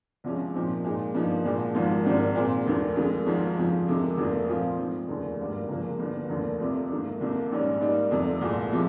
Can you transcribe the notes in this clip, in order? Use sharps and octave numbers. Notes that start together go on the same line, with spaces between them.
C2 C3 F3 G#3 C#4
A#2 F3 C4 D#4
A#2 G#3 D#4
G2 F3 A#3 D#4
C2 A#2 F3 G#3
G#1 G#2 F3 A#3 F4
G#1 G#2 D#3 G3 C4
A#2 G#3 C4
F1 D#2 D#3
F2 D#3 G#3
G#1 G#2 F3
F2 C#3 F3
F2 C3 D#3 G#3
F1 F2 D#3 A#3
A#2 F3 C4 F4
G#2 F3 C4
F1 D#2 C#3
G#1 G2 G3 A#3
C#2 C#3 F3 A#3
G1 G2 D#3 A#3
F1 D#2 D#3 A#3
F2 C3 F3
G#2 D#3 A#3
C2 C3 D#3 A#3
A#1 G#2 G3 C#4
G#2 G3 A#3 D#4
F1 F2 C3
C2 A#2 G#3
C3 F3 G#3